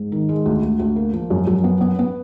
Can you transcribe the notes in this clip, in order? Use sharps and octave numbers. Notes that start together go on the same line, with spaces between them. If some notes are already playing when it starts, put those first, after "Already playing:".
Already playing: G#2
D#3
G#3
D2
D2
D2
A#3
F3
F#2
F#2
B3
B3
B3